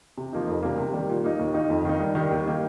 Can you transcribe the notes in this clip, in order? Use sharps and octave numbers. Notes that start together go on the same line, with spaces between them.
C3
F3 A#3 D#4
F2
C3 G3 A#3
C3
D#3 G3 A#3
A#2
A#3 D#4
D#2
D#3 A#3 D#4
F2
D#3 A#3 D#4
G2
D#3 G3 D#4
D#2
D#3 A#3 D#4